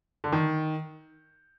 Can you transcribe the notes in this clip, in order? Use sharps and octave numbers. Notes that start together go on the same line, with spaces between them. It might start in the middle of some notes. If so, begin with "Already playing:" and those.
D3
D#3